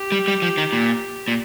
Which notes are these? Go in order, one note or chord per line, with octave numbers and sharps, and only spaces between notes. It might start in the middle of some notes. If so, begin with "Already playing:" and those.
Already playing: G4
G3
G3
F3
D#3
A#2
A#2